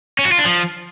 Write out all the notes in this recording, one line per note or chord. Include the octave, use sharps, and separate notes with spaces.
C#4
F#4
F4
D4
F3